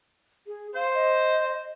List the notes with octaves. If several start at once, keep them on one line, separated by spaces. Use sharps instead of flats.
G#4
C5 F5
D#5